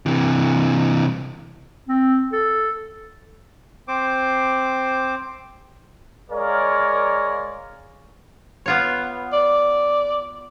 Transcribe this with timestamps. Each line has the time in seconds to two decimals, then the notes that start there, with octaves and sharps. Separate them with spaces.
0.06 C3 E3
1.88 C4
2.32 A4
3.88 C4 C5 D6
6.31 G#3 G#4 A#4 C#5 D5 F5
8.66 B3 F4 C#5
9.33 D5